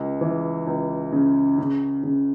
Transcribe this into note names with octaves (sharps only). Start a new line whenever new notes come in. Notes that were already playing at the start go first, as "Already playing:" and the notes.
Already playing: C#2
E3
C#2
C#3
C#3
C#3